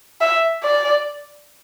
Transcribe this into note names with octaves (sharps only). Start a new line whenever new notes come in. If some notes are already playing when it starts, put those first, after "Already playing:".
E5
D5